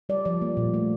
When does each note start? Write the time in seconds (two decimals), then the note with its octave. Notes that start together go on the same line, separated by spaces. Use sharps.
0.09 G3 D5
0.25 F3 D5
0.42 A#3
0.57 A#2
0.74 A3